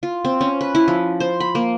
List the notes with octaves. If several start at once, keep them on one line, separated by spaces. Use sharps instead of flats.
F4
C4
C#4
B4
E4
F3
C5
B5
A#3